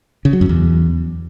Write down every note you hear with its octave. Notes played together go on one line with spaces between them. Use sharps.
C#3
F#3
F#2
E2